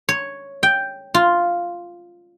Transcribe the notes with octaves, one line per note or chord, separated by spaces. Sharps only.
C#5
G5
F4